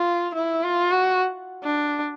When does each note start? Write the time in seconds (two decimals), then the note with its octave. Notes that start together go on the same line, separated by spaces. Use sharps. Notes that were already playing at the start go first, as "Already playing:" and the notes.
Already playing: F4
0.35 E4
0.63 F4
0.92 F#4
1.63 D4